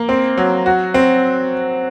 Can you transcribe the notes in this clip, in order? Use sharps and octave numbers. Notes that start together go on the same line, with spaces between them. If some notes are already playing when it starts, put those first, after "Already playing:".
Already playing: A#3
C4
F#3
F#4
C4